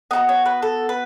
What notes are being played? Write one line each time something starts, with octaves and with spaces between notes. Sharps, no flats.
B3 D#4 F#4 D#5
C#5
B4
A4
B4